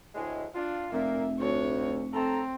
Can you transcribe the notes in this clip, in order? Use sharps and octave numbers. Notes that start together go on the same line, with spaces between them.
D2 A2 G#3
D4 F4
F1 A#2 A#3 E5
D2 C#5
C4 A4 A#5